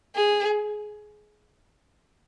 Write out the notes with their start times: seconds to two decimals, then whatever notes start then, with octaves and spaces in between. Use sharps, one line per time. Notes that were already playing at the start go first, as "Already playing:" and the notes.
0.16 G#4